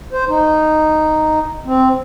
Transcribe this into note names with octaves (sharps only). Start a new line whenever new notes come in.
C5
D#4
C4